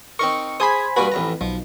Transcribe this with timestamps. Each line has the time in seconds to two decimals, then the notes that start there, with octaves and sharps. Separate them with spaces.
0.19 C4 D#4 A#4 C#6
0.60 G#4 C5 G#5 B5 D#6
0.96 G2 A#3 F#4 B4
1.12 A1 F2 A#5
1.41 B1 F3